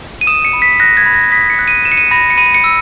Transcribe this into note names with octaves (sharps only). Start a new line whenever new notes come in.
D#7
D#6 E7
C#7
B5
B6
F#6 A#6
G#6
B5
A#6
D#6 B6
C#7
F#6
D#7
F#6 E7
C#7
D#7
B5 A#6
C#7
B5 D#7
C#7
E6